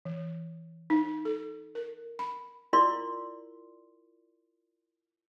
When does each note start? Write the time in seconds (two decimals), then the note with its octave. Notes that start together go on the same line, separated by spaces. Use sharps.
0.05 E3
0.90 D#4
1.25 A4
1.75 A#4
2.19 B5
2.73 E4 F4 A#4 D5 C6